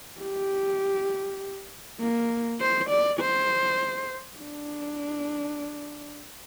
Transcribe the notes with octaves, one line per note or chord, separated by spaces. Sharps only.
G4
A#3
C5
D5
C5
D4